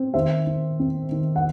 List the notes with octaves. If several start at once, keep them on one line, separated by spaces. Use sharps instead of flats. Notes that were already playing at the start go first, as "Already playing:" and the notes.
Already playing: C4
D#3 C5 E5
D#3
C4
D#3
F#5